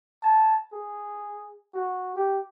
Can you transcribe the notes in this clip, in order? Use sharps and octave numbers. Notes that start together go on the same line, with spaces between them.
A5
G#4
F#4
G4